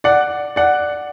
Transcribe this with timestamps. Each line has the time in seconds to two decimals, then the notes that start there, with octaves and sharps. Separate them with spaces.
0.04 D5 F#5
0.56 D5 F#5